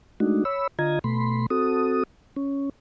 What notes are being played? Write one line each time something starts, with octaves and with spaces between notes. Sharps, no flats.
G#3 A3 D4 D#4 F#4
C#5 B5 E6
D3 F4 D#5 A#5 G#6
B2 A3 B5 C6
C4 F#4 A4 D#6
C#4